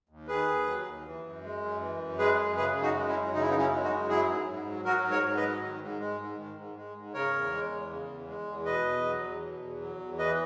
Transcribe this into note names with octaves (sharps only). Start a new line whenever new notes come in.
D#2
D#3 G#4 B4
D#2
F#3
D#2
E3
F#2
G#3
F#2
E3
F#2
G#3 G#4 B4
F#2
C#3 G#4 B4
F#2
D#4 F#4
G#3
C#4 E4
F#2
C#3 D#4
E4
B3 D#4
F#2
C#4 E4
G#3
D#4 F#4
F#2
F#3 E4 G#4
G#2
G#2
F#3
F#3 F#4 A#4
G#2
A#4 C#5
G#2
B4 D#5
F#3
D#3
G#2
G#3
G#2
D#3
G#2
G#3
G#2
C#3 A#4 C#5
E2
G#3
E2
C#3
E2
G#3
E2
B2 B4 D#5
E2
F#3
E2
B2
E2
F#3
E2
E3 B4 D#5